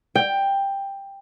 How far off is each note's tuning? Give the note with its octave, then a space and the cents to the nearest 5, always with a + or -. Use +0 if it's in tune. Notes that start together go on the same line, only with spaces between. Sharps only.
G5 +10